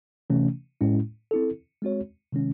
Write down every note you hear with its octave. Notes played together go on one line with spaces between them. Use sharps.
C3 E3 A3 C#4
A2 G#3 C#4 E4
C4 E4 A4
G#3 C4 F#4 C#5
C3 D#3 G#3 C#4